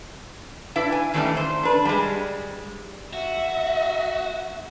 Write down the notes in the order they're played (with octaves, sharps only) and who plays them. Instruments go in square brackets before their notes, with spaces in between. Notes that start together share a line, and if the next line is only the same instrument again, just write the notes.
[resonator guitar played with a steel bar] D4 E4 B4
G#5
D#3 E3 G3 A3 C#4 D4
C5
D4 B4
G3 G#3
[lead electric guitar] F#4 [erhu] E5